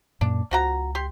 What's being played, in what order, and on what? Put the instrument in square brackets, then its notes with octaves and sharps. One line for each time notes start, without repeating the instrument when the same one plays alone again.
[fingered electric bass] F#2 A#2 A#3 [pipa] D4
[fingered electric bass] C#2 [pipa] F3 F#4 A#5
[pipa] G4 C6